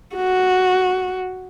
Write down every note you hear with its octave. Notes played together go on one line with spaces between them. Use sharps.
F#4